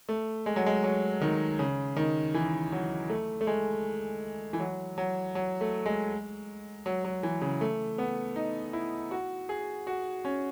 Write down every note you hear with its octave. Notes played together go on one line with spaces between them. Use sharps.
A3
G#3
F#3
G#3
F#3
D#3
C#3
D#3
E3
F#3
A3
A3
G#3
E3
F#3
F#3
F#3
A3
G#3
F#3
F#3
E3
C#3
A3
B3
D#4
E4
F#4
G#4
F#4
C#4